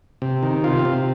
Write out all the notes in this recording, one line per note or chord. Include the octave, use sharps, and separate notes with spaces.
C3
D#3
C3 F4
C3